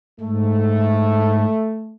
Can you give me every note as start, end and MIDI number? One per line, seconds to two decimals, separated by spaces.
0.20 1.45 44
0.20 1.95 57